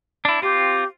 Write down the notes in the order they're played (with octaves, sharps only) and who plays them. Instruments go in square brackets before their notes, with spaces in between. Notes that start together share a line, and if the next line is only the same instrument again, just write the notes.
[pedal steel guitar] D4 E4
[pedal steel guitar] C4 F4 [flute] G4